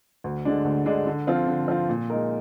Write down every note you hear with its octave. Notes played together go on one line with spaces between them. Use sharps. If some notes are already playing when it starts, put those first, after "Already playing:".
D2
D3 G#3 D4
D2
D3 G#3 D4
D3
F3 C4 F4
D3
F3 C4 F4
A#2
G#3 D#4 A#4